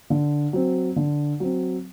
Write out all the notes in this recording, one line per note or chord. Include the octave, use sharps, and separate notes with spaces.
D3
F#3 C4
D3
F#3 C4